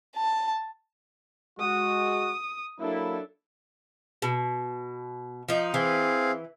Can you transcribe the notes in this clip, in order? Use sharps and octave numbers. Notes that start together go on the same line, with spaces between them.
A5
G#3 F#4 D#6
F#3 A#3 D4 E4 A4
B2
F3 D#4
E3 C4 G#4 F5